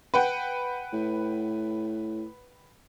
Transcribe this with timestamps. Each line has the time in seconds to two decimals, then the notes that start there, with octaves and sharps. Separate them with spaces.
0.14 B4 F#5 G5
0.93 A2